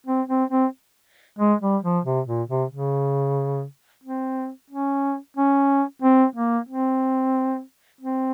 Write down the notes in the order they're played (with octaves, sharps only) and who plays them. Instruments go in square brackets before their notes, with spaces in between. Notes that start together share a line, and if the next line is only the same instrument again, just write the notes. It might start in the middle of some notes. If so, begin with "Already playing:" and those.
[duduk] C4
C4
C4
G#3
G3
F3
C3
A#2
C3
C#3
C4
C#4
C#4
C4
A#3
C4
C4